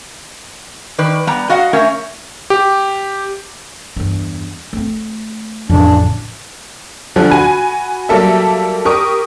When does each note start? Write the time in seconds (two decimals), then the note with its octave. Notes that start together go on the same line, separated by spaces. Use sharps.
0.98 D#3 B4 D5
1.27 G3 B3 A#5
1.49 F#4 D#5 F5 F#5
1.73 A3 C#4 A#4 C#5 E5
2.50 G4
3.96 E2 G2
4.73 A3 C4
5.70 A1 F2 C#3 D4
7.16 D2 D3 F3 G3
7.30 F#4 G#5 B5
8.09 F#3 G3 A#3 A4 E5
8.85 G4 A#4 C#6 D#6